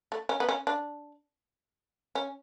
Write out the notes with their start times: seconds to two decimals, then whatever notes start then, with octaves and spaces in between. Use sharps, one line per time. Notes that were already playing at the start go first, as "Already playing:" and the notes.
0.12 A3
0.29 C#4
0.40 B3
0.49 C#4
0.67 D4
2.15 C#4